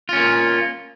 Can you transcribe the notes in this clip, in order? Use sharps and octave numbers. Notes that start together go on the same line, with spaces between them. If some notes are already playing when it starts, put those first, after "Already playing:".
A#3 C#4 F4